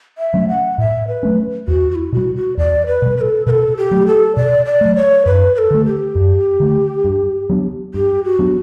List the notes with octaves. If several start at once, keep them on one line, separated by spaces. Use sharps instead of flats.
E5
F#3 A3 C#4
F#5
A2 E5
B4
F#3 A3 C#4
E2 F#4
F#4
E4
B2 G3 F#4
F#4
E2 D5
B4
B2 G3
B4
A4
B2 A4 B4
G4
F#3 A3
A4
B2 D5
D5
F#3 A3
C#5
F#2 B4
B4
A4
D3 A3
G4
F#2
D3 A3
G2
F#3 B3 D4
G2 G4
F#4
F#3 B3 D4